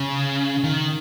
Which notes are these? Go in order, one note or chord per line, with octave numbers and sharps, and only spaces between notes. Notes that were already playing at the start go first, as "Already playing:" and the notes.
Already playing: C#3
D#3